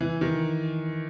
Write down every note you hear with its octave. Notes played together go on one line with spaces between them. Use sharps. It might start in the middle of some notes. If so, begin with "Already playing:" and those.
E3
D#3